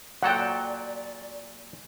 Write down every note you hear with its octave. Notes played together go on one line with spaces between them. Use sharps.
A#2 F#3 A4 D5 F#5 G5